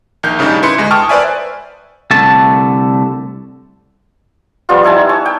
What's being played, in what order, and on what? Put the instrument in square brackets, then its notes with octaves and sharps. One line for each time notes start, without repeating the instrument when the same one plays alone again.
[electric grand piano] A#1 D#3 G6
A2 C#3 G3 D4 D#4
E4 B4 C6 C#7
D2 G#3
G5 A5 C#6 D#6 F6
B4 C5 D5 E5 G#5
[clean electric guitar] C2 D3 A3 A5
[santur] F3 G3 B3 F4
D#4 E4 G#5 A5
C#5
G5